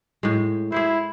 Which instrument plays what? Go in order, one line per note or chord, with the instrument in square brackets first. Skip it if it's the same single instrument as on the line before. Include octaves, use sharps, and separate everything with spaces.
[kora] A2 G#3
[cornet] E4 [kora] G#4 C5